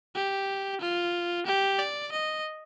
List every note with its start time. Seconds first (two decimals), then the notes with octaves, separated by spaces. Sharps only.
0.15 G4
0.81 F4
1.46 G4
1.79 D5
2.12 D#5